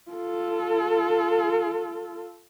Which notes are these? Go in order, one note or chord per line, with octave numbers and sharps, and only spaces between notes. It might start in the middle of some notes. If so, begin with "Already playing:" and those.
F4 A4